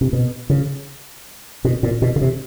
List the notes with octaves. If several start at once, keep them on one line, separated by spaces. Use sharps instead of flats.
C3
B2
C#3
B2
A#2
B2
C#3
C3